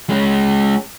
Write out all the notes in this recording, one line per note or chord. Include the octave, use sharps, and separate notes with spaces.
G#3 C#4